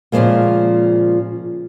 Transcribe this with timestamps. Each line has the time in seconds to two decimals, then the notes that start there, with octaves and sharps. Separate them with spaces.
0.12 A#2 C#3 E3 F3 G#3 A#3